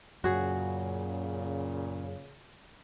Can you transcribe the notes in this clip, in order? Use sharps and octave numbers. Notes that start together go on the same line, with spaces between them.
F#2 A#2 C#3 F#4 G#4